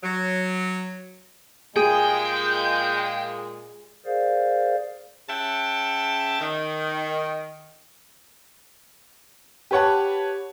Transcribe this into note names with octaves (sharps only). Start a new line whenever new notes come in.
F#3
A#2 G#3 G#4 G5
G#4 A#4 C5 D5 F5
C#3 E5 F#5 G5 A5
D#3
G4 B4 C#5 F#5 A5